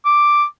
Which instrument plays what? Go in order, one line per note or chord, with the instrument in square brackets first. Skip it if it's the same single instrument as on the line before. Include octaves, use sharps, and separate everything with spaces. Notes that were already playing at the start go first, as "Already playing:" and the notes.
[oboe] D6